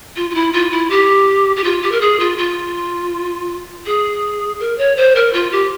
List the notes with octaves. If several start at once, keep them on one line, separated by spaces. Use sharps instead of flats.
F4
F4
E4
F4
E4
G4
G4
F4
G4
A#4
G#4
F4
F4
G#4
A#4
C#5
C5
A#4
F4
G4